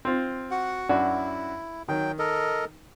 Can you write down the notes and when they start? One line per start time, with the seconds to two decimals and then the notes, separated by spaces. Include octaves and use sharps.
0.05 C4 F4
0.51 F#4 F#5
0.89 F#2 D4 E4 F#4
1.88 D#3 F#3 G5
2.19 A4 A#4 D#5